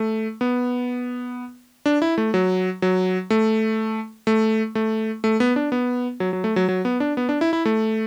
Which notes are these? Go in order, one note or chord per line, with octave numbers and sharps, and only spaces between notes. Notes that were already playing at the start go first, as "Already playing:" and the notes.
Already playing: A3
B3
D4
E4
A3
F#3
F#3
A3
A3
A3
A3
B3
D4
B3
F#3
F#3
A3
F#3
F#3
B3
D4
B3
D4
E4
E4
A3